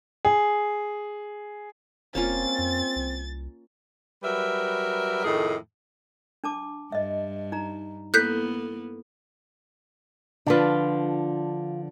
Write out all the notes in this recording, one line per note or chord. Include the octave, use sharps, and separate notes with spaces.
G#4
E1 A#3 C4 C#4 F4 A6
F2
C2
F#3 G3 A#4 B4 E5
F2 A2 D#3 A3 G#4
D4 A5 D6
G2 D#5 E5
D#4 A#5
A#3 B3 E4 A4 F#6 G6 B6
D3 F3 D4 F4 B4